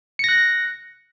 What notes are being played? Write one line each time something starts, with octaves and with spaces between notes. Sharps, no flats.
F#6 A#6 C#7